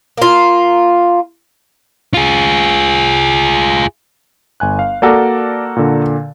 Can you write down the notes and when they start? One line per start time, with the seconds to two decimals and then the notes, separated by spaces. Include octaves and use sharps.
0.17 A#3 F4
2.14 F4 G#4
4.60 G1 G#5 F#6
4.79 F5
5.02 A#3 F#4 A4 D5 D6
5.77 A#2 D3